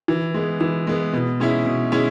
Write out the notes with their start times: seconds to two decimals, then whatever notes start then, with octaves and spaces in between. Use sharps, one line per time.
0.08 E3
0.34 G#3 B3
0.60 E3
0.87 G#3 B3
1.13 B2
1.40 G#3 C#4 E4
1.66 B2
1.92 G#3 C#4 E4